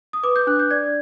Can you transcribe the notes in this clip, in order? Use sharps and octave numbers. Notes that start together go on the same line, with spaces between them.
D#6
B4 D6
G6
D4 F#6
G6
D5 G#6